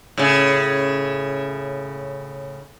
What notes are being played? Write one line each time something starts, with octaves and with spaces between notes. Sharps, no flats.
A2 C#3